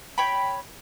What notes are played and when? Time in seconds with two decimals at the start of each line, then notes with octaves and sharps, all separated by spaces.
0.18 C#5 G5 B5